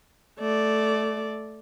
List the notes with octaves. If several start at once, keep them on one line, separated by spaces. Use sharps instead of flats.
A3 D5